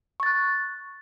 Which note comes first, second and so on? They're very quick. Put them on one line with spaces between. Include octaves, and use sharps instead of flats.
C#6 A6 F#6